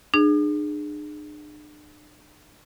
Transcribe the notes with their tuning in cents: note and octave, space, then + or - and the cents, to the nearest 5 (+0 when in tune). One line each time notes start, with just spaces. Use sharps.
D4 +40 G#4 +0